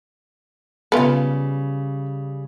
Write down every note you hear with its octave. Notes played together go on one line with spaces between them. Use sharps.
C#3 G3 B3 F4